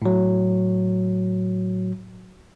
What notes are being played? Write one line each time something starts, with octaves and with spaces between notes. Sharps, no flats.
A2 F#3